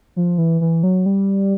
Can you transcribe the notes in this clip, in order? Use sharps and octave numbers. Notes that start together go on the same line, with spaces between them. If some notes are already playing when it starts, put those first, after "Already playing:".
F3
E3
E3
F#3
G3